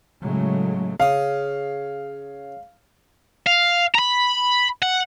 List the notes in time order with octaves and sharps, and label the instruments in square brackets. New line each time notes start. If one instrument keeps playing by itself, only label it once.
[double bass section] A2 C#3 F#3 G#3 A3
[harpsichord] C#3 D#6 [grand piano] F5
[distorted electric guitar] F5
A#5 B5
F#5